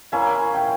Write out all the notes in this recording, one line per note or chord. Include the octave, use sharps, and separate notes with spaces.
A#3 C#4 E4 G#5
G5